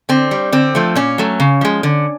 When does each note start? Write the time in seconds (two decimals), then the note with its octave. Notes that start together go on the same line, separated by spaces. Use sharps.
0.09 D3 C4
0.31 G3
0.52 D3 C4
0.75 F3 A3
0.95 A#2 C#4
1.18 F#3 A3
1.40 C#3
1.61 F3 G#3
1.83 D3